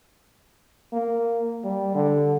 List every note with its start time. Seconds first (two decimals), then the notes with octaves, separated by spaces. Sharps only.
0.93 A#3
1.64 G3
1.95 D3